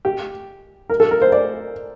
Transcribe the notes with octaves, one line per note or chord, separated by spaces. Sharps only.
G4
A#4
A4
A#4
C5
D5